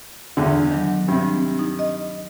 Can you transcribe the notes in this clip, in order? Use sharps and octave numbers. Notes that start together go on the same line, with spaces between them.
E2 D3
D#3 F#3
G2 C3
D#4
D#5